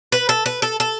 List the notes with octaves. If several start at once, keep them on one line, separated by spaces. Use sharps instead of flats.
B4
A4
B4
A4
A4